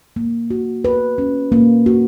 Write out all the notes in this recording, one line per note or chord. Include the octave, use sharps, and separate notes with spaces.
A#3
F#4
B4
C#4
A#3
F#4